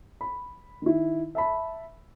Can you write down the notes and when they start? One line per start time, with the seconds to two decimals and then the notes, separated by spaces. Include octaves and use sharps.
0.21 B5
0.82 D#3 E4
1.35 E5 A5 B5